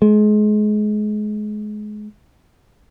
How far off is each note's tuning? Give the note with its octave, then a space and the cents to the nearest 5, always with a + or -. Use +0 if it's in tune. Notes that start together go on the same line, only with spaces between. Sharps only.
G#3 +30